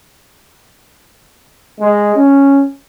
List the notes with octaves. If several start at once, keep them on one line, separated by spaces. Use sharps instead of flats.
G#3
C#4